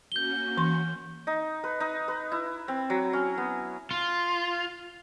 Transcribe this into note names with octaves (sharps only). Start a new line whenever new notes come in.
A#3 C#4 F#4 G6 G7
E3 C6
D#4
B4
D#4
B4
E4
C4
F#3
C#4
B3
F4